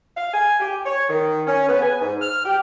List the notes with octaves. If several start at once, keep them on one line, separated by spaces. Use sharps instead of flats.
F5
G#5
G4
C#5
D#3
C#4
B3
G#5
G#2
F6
G4